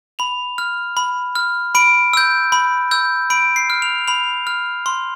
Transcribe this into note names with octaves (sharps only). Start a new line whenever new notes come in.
B5 F7
F6
B5
F6
B5 D7
E6 G6
B5
E6 G6
B5 D7
C7
F6
F7
B5 F7
F6
C6